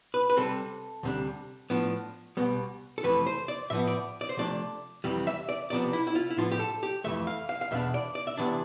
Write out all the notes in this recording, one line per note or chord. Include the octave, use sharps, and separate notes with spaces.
B4
B4
C3 G3 C4 A4
D2 C3 G3 D4
A2 F3 B3 D4
C2 B2 G3 B3
A4
F2 C3 E3 A3 B4
C5
D5
A2 F3 B3 E5
D5
D5
C5
C3 F3 A3 D4 D5
F2 C3 E3 G3
E5
D5
C2 C3 F3 B3 D5
E4
E4
F4
E4
A2 F3 B3 D4 F4
G4
A4
G4
F2 C3 E3 A3 E5
F5
F5
F5
E2 B2 B3 D4 E5
D5
D5
E5
C3 E3 B3 D4 D5